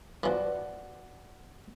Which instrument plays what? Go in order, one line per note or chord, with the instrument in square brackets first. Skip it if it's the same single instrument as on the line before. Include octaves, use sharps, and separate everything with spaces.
[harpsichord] E3 F3 [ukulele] F#4 D5